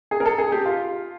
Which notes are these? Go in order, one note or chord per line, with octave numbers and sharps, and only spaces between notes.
G#4
A#4
A4
G#4
G4
F4